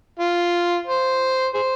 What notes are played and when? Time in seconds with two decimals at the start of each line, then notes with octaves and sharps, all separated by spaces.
0.20 F4
0.87 C5
1.54 G#4 C5